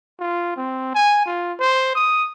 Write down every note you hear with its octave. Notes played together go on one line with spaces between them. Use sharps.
F4
C4
G#5
F4
C5
D#6